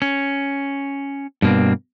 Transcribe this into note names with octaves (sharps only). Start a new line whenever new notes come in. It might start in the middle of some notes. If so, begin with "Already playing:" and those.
C#4
G2 B2 A#3 C4